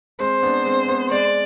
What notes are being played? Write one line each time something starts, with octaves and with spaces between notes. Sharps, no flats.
G#3 C4 C5
B3 D4
G#3 C4
B3
G#3 D5